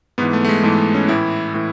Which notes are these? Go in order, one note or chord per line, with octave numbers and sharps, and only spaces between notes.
G#2 E3 B3
A3
A3
G#3
G#2 E3 A3
C#4
A2 E3 E4
A2 E3